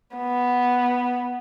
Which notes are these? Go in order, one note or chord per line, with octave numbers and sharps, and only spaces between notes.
B3